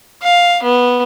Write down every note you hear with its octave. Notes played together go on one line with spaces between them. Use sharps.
F5
B3